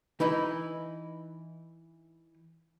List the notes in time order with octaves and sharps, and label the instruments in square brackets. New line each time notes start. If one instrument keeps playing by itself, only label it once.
[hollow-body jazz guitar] E3 D#4 E4 B4